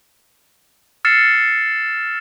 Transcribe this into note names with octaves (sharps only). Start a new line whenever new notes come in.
E6 F6 A6 C7 C#7 E7